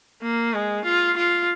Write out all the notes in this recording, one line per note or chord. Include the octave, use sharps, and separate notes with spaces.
A#3
G#3
F4
F4